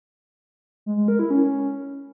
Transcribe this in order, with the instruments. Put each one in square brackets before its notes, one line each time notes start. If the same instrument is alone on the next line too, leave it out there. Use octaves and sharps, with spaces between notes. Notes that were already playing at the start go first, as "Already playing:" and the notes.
[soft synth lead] G#3
G#3
A#4
E4
C#4